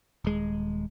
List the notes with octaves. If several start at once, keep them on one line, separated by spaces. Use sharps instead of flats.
D#1 G#3